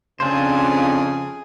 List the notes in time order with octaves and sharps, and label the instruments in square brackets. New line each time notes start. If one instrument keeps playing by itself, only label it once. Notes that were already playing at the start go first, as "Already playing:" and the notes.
[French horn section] F2 [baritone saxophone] C#3 [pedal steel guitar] C4 D4 C5 [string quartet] G#4